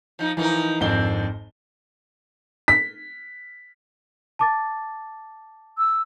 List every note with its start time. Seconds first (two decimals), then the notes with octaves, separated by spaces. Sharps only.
0.19 F3 D#4
0.37 E3 F3 D#4 A#4
0.80 G#1 F2 C4 D4 G7
2.68 B6
4.39 A5 D6 A6
5.77 E6